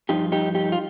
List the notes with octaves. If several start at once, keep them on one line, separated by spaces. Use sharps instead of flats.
G2 F3 D#4 G4
D#4 G4
D#4 G4
F4